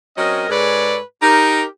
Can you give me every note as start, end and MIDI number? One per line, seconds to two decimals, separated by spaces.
0.17 0.48 54
0.17 0.48 60
0.17 0.48 61
0.17 0.48 70
0.17 0.48 75
0.50 0.99 44
0.50 0.99 56
0.50 0.99 69
0.50 0.99 71
0.50 0.99 73
0.50 0.99 74
1.22 1.63 63
1.22 1.63 67
1.22 1.63 70